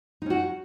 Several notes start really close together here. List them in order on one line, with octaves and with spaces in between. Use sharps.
D#4 C#4 F#4